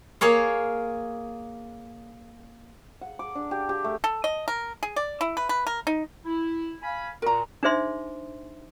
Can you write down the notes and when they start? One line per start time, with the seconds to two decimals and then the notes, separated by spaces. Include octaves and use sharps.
0.21 A#3 G#4 C#5 F5
3.01 F#5
3.19 D6
3.35 D4
3.51 G4
3.69 G4
3.84 A3
4.04 A4
4.24 D#5
4.48 A#4
4.83 G#4
4.96 D5
5.21 E4
5.37 B4
5.49 B4
5.67 A#4
5.87 D#4
6.25 E4
6.82 F5 G#5 B5
7.22 A#2 F#4 A#4 A#5
7.63 D4 D#4 G#4 C5 E5 C6